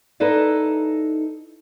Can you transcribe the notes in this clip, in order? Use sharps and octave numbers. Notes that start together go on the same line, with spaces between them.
D#4 E4 A4 B4 D5